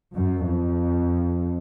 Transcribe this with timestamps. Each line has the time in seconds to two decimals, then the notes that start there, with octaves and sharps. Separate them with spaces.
0.15 F#2
0.47 F2